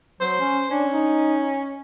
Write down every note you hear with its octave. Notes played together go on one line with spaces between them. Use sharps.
F#3 C5
C#4
C#4 D4
D#4